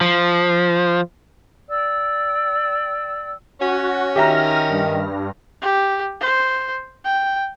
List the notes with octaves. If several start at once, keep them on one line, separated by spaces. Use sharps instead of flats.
F3
D5 G5 E6
C#4 F#4
D#3 G4 E5 A#5 F6 A#6
G2
G4
C5
G5